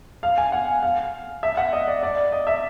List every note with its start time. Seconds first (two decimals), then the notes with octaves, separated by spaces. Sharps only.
0.23 F5
0.38 G#5
0.52 F#5
0.83 F5
1.43 E5
1.57 F#5
1.73 D#5
1.88 D5
2.03 D5
2.32 D#5
2.47 E5